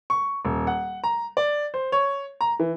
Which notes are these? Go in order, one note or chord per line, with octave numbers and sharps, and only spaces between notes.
C#6
D#1
F#5
A#5
D5
C5
C#5
A#5
E3